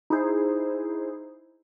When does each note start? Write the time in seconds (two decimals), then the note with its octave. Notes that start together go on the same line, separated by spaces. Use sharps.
0.10 D#4 E4 G#4 C5